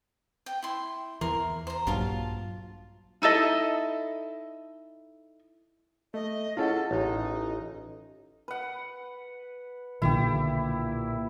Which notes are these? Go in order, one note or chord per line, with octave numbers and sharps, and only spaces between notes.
G5
E4 C6
E2 E3 A#4 C6
C5 A#5
A#1 G2 F#3 F4 F5 A5
D#4 E4 A4 D#5
A3 D#5
C#4 E4 F4 G#4 A4 F#5
A1 D#4
B4 F#5
B1 A#2 D3 D#3 E4 G4